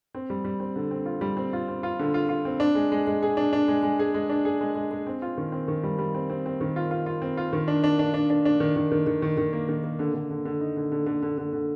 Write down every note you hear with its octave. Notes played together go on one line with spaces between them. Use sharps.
C4
G3
G3
C4
D3
C4
F4
G3
C4
F4
C4
F4
D3
F4
F4
C4
D4
G#3
G#3
G#3
G#4
D4
D4
G#3
G#3
G#4
G#3
D4
G#4
G#3
G#3
G#3
C4
F4
D#3
C4
D#3
G3
G3
C4
C4
C4
D#3
F4
F4
F4
C4
F4
D#3
D4
D4
D4
D4
D4
D4
D#3
D#3
D#3
D#3
D#3
D#3
A#3
D#3
A#3
D3
D3
D3
D3
D#4
D3
D3
D3
D3
D3
D3